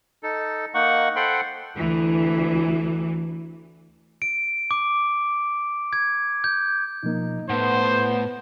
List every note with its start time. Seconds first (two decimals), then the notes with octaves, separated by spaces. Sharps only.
0.23 D#4 A4
0.74 A#3 D#4 F#5 C#6
1.16 A4 C5 F#5 G5 B5 C6
1.74 D2 E3
4.22 D7
4.71 D6
5.93 G#6
6.44 G6
7.03 B2 F3 A#3 D#4
7.50 A2 B3 C5 F#5